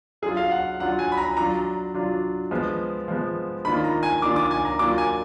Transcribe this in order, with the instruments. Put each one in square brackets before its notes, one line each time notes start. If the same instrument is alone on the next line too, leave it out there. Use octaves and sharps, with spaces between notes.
[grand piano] F#3 D4 F4 G#4
F5
F#5
F#3 D4 F4 F#5
G#5
B5
A#5
F#3 D4 F4 A#5
F#3 D4 F4
F3 G#3 B3
F3 G#3 B3
D#3 A#3 D4 F4 B5
A#5
G#5
D#3 A#3 D4 F4 D6
D6
G#5
A#5
F#3 A#3 D4 F4 D6
G#5